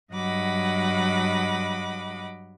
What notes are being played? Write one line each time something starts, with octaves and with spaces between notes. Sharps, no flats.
G2 F#3 D#5 F#5 B5 D6